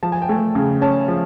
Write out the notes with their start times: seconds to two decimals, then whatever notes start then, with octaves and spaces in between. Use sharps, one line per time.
0.03 F3 A5
0.12 G#5
0.22 G5
0.29 A3 G#5
0.55 C#3
0.81 C#4 A5
1.08 F3